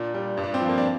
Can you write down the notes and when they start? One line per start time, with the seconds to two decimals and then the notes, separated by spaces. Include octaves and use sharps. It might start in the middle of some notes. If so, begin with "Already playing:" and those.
Already playing: A#2 D4
0.14 G3
0.37 G2
0.44 D4
0.54 C4
0.61 F3
0.69 A#3
0.78 D4